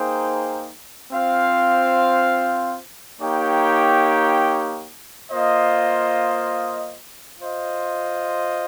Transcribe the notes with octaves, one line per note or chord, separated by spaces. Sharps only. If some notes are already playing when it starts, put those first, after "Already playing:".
Already playing: A#3 D#4 G#4 C5 G5
C4 F4 C5 F5
A#3 D#4 G4 C#5 G5
A#3 F4 C5 D#5
F4 C5 D#5